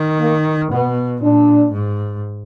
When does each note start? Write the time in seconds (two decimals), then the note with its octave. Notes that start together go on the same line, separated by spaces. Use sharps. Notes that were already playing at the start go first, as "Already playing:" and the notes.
Already playing: D#3
0.21 A#3
0.71 B2 B3
1.22 A#2 D4
1.73 G#2